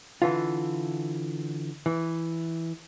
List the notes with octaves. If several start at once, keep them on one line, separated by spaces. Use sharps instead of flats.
D3 E3 F4
E3